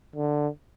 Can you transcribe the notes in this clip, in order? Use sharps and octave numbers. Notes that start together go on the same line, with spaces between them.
D3